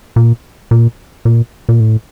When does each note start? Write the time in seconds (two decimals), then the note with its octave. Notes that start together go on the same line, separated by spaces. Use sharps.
0.16 A#2
0.71 A#2
1.25 A#2
1.69 A#2
1.80 A2